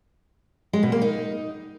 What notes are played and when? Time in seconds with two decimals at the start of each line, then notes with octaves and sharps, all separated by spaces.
0.73 G#3
0.83 B2
0.92 A#3
1.02 D#4